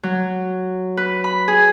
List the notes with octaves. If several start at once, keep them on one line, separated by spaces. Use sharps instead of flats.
F#3
B4
B5
G#4